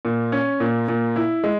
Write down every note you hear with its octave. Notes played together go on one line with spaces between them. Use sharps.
A#2
C#4
A#2
A#2
E4
G#3